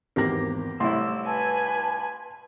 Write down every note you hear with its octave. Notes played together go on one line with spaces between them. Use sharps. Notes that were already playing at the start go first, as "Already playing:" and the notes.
G#1 E2 A#3 G4 A#4 A#6
C2 A2 E4 C6 E6
B4 G#5 A5